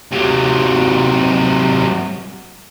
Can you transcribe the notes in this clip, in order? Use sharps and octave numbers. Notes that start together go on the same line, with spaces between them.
C3 F#3